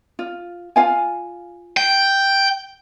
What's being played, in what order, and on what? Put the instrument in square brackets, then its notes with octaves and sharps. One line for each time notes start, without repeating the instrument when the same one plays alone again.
[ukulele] F4
F4 F5 G#5
[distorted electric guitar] G5